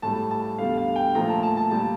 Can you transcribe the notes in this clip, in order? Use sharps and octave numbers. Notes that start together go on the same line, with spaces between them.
A2 G3 A5
A5
E2 D3 G3 F5
F5
G5
A#2 F3 A3 A#5
A5
A5
A5
A#2 G3 A5